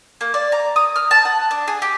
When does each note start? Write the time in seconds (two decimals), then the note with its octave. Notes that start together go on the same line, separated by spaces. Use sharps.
0.21 A#3
0.34 D5
0.52 A#5
0.76 D#6
0.96 F6
1.11 A5
1.25 F#5
1.51 D4
1.68 G#4
1.82 G4